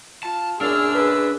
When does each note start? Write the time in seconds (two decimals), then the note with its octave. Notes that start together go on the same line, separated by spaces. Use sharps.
0.23 F4 A5
0.61 F#2 A#2 D4 G#4 E6 F6
0.95 B4